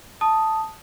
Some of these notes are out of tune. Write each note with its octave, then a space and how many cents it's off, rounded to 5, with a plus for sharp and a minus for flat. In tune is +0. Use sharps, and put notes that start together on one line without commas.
A5 +0 D#6 +0